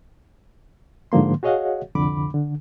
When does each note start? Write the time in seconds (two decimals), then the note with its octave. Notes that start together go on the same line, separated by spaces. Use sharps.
1.12 G#2 D3 F3 A#3 C6
1.43 F#4 G#4 C#5 D#5 F5 F#5
1.95 C2 F2 D3 B5 D6
2.34 D3